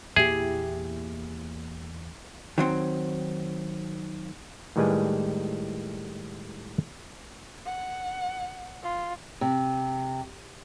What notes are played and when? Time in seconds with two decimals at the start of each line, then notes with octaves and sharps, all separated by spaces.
0.16 E2 A#2 A#3 E4 G4 G#4
2.58 D#3 F#3 C4
4.76 A2 D#3 G3 G#3 B4 G#5
7.66 F#5
8.82 F4
9.41 C3